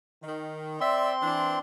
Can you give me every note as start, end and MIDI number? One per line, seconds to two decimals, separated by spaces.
0.23 0.79 51
0.80 1.59 60
0.80 1.11 74
0.80 1.11 76
0.80 1.59 84
1.21 1.55 52
1.21 1.55 62